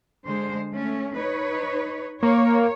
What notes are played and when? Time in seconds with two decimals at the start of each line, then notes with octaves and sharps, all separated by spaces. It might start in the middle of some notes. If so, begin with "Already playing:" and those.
0.25 D3 G#3 C5
0.73 A3 C#4
1.18 D#4 B4 C#5
2.23 A#3 C#5